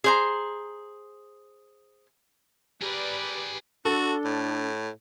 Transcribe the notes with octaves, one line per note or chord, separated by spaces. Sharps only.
G#4 C5 A#5
G4 G#4 A#4 B4 D5
D4 F#4 A4
A2